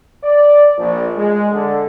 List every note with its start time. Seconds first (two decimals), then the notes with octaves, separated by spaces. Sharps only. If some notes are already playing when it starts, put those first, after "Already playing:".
0.24 D5
0.77 A#1
1.17 G#3
1.52 D3